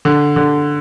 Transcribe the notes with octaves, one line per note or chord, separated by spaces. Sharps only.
D3
D3